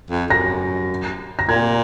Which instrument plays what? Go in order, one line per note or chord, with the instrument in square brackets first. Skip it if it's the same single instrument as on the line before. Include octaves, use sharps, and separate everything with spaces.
[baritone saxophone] F2
[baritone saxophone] F#2 [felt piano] A#6
[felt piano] A#6
[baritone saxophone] A#2 [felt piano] G#6